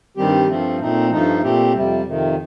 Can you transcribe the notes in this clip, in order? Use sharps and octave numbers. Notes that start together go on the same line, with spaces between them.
G2 D#3 G3 C4 G4
G2 F3 A3 C4
A#2 A3 C4 D#4
G2 F3 A3 D#4
A#2 A3 C4 G4
F2 C3 G3
F2 C3 D#3